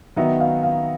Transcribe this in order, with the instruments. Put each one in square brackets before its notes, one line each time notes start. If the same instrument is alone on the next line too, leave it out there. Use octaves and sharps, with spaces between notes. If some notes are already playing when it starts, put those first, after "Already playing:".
[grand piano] D#3 F#3 B3 D#4 F#4 [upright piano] E5
[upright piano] F5
F5